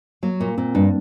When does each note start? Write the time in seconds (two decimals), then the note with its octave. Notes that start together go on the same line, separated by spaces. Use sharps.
0.23 F#3 A#3
0.40 A#2 A#3
0.58 A#2 C4
0.75 G2 D4